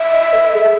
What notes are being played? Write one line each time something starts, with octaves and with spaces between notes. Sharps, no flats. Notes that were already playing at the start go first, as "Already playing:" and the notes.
Already playing: E5
D#5
A4
G#4